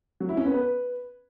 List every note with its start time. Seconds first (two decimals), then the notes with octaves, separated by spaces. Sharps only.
0.20 F#3
0.29 E4
0.37 C#4
0.46 B3
0.54 B4